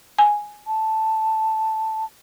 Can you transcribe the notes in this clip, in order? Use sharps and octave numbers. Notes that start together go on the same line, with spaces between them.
G#5
A5